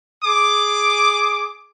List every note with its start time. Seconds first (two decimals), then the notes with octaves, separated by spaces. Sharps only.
0.24 G#4 D6